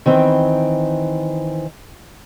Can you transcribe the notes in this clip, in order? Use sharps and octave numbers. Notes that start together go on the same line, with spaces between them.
D#3 E3 C4